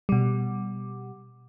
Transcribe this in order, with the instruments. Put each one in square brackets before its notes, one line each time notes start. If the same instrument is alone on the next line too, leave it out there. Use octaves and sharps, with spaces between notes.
[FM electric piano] B2 G3